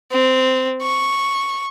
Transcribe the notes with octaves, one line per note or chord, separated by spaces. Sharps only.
C4
C#6